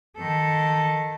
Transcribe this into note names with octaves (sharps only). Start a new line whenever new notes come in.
D#3 A4